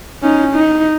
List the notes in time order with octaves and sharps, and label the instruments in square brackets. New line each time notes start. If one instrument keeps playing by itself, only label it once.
[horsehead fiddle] C#4 D#4
D#4